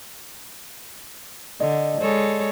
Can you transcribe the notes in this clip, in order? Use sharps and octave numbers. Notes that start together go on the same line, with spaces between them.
D3 D5 D#5
G#3 A4 C#5